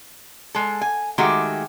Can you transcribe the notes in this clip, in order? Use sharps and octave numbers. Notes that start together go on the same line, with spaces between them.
G#3 A4
G#5
D#3 G#3 A3 F#4 G4